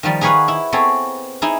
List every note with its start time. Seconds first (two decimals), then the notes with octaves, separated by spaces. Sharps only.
0.03 D#3 F3 G3 D#4
0.21 D#4 G#4 B4 C#5 F5 F#5
0.48 E4
0.72 B3 C4 G#4 A4 C#5
1.42 D#4 E4 G#4